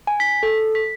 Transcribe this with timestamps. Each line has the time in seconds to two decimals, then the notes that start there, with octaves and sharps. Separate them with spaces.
0.07 G#5
0.20 B6
0.43 A4
0.75 B6